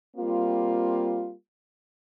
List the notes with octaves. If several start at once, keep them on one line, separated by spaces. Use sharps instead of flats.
G3 A#3 C4 F4